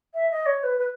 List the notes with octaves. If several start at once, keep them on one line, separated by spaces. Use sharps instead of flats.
E5
D#5
C#5
B4
B4